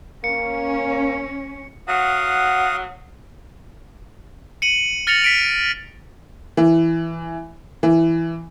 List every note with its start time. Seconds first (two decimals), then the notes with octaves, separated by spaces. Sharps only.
0.24 A#3 C#4 C#7
1.88 F#3 F5 F#5 D#6
4.62 C#7 D#7 F#7
5.07 F6 A6 A#6 C#7 F7 F#7
5.22 B6 D7 F7
6.57 E3
7.83 E3